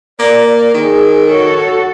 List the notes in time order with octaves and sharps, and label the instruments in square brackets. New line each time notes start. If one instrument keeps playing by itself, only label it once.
[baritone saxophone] A#3 [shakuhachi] D5
[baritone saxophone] D#3 [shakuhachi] G#4
[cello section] F#4 A4 [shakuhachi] C#5